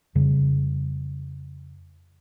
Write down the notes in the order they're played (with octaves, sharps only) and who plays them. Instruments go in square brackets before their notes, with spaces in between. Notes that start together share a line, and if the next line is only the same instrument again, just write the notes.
[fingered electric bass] F2 C#3 G3